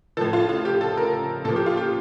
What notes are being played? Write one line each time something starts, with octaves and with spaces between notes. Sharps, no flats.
A2 F3 A4
F4
F4
G4
A4
A#4
A#2 F3 A4
G4
F4
G4